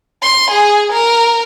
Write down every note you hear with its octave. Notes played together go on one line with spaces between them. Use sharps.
C6
G#4
A#4